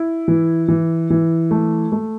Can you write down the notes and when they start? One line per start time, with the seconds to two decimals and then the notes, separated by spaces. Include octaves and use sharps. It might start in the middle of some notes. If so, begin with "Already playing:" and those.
Already playing: E4
0.28 E3
0.68 E3
1.10 E3
1.51 A3
1.92 A3